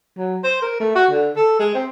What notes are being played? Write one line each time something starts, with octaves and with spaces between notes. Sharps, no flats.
F#3
C5
A#4
A3
F#4
D3
A4
G#3
C4